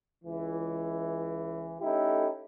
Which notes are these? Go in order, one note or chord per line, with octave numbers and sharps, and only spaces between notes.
C#2 E3
A3 C#4 D#4 E4 G4 A4